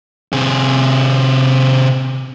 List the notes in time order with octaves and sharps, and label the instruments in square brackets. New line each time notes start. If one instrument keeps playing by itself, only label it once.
[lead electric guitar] C3 G#4